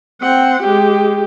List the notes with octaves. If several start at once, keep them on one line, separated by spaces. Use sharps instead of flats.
C4 F#5
G#3 G4